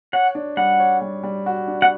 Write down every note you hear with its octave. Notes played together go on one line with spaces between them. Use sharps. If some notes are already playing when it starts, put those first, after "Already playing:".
C#5 F#5
D4
G3 F#5
C#5
G3
G3
F#4
D4
F#5